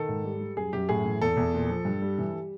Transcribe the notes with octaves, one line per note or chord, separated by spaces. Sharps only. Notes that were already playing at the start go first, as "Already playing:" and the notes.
Already playing: D#3 A4
G#2
G3
G3
F#2 G#4
F#2 G4
A2 G#4
E3
E2 A4
E2
A#2
F3
G2
G3
E3
G3